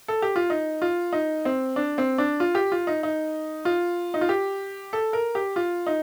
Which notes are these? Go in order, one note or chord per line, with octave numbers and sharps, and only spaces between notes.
A4
G4
F4
D#4
F4
D#4
C4
D4
C4
D4
F4
G4
F4
D#4
D#4
F4
D#4
F4
G4
A4
A#4
G4
F4
D#4